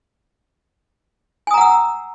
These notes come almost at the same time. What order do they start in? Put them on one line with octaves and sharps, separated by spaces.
G#5 D#6 A#5 F#5 E6